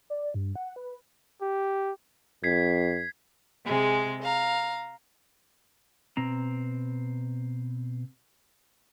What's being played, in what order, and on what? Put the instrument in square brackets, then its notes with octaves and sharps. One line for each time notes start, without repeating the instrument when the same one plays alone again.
[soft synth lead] D5
G2
F#5
B4
[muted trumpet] G4
[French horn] F2 [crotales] G#6 B6 C7
[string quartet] C3 G#3 G#4
F5 A#5
[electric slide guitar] B2 C4 A#5